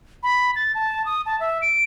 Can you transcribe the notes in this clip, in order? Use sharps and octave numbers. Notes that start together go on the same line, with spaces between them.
B5
A6
A5
D#6
A5
E5
D7